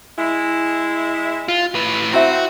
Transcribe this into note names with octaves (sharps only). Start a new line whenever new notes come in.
G#3 E4
F4
A2 B4
C4 E4 F#4 E5